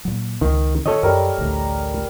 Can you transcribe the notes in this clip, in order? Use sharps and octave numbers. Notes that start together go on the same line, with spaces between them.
A#2 F#3
C#2 D#3
D#3 A4 C#5 D#5
F#2 G3 A#4
A1 D2